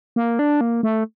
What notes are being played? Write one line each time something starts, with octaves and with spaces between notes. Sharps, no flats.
A#3
D4
A#3
A3